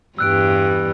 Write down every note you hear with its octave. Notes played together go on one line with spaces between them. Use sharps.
E2 G2 G3 E6 F#6 D7